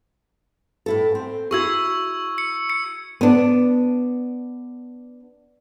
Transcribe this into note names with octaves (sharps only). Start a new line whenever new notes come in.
A2 E4 A4
C4
E4 F#4 G#4 C#6 E6 G#6
C#7
C#7
B3 D4